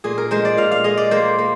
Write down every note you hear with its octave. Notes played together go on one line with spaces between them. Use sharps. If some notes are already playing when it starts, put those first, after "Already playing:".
A#2 G#4
A#4
G#3 C5
D5
A#2 F5
F5
G#3 D#5
D5
A#3 C5
A#3